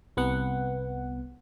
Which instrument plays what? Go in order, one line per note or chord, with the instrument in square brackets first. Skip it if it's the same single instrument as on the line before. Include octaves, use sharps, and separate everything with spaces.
[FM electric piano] C2 B3 F#5